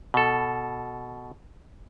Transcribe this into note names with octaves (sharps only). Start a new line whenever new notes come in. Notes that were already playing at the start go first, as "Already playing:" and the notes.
B2 A4